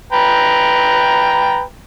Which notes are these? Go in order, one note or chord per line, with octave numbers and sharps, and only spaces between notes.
B4 G5 A#5